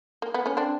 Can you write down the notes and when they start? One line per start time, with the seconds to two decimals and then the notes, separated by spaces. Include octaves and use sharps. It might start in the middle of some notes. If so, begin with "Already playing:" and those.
0.22 A#3
0.34 B3
0.46 B3 C#4
0.57 C4 D4